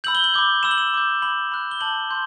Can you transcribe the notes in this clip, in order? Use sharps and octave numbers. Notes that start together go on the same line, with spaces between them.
B5 E6 G6 F#7
G7
F#7
B5 D6 G6
B5 E6 G6 E7
F#7
E7
B5 D6 G6
B5 D6 G6 F#7
B5 F#6
G7
A5 D6 G6 F#7
C6 G6